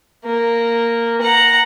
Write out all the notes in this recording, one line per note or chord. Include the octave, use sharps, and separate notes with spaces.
A#3
F#5 A#5